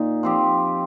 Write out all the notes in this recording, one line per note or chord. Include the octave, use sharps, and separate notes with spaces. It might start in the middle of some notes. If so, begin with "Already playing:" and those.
Already playing: A#2 D#4
F3 C4 G4